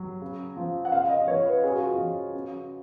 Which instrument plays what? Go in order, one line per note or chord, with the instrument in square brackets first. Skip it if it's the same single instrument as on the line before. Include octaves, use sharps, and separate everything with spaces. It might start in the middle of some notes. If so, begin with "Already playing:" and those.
Already playing: [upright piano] F#3
C#3
F3
F#5
C#3 F5
D#5
F3 C#5
B4
C#3 G#4
F#4
F4
F#4
F3
C#3